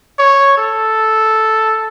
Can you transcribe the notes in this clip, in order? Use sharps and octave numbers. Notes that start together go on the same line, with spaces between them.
C#5
A4